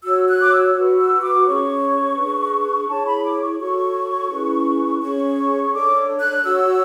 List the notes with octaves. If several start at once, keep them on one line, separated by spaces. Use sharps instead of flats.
F#4 C#5 E6
F#6
D6
E6
F#4 B4
E6
D6
C#4 G#4 C#5 C#6
D4 G#4 B4
E4 G#4 C#5 A5
B5
D6
C#6
F#4 A4 C#5 C#6
C#4 E4 G#4 B4
C#4 G#4 C#5 C#6
D4 A4 C#5 D6
F#6
F#4 C#5 E6